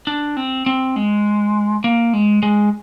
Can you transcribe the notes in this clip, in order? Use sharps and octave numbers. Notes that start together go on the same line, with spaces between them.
D4
C4
C4
G#3
A#3
G#3
G#3